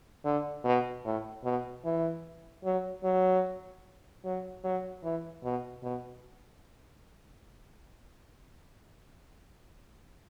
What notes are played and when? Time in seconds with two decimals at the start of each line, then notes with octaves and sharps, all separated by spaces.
0.25 D3
0.65 B2
1.05 A2
1.44 B2
1.85 E3
2.64 F#3
3.04 F#3
4.25 F#3
4.64 F#3
5.04 E3
5.44 B2
5.83 B2